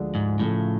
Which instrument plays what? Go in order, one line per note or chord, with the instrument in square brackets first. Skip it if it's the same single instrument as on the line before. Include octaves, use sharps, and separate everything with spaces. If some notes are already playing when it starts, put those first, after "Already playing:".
Already playing: [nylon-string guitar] D2 D3 F3 G#3
[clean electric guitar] G#2
[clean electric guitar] A2 [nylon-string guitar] C#3 F3 A3